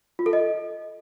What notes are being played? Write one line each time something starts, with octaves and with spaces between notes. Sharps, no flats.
F4
A4
D#5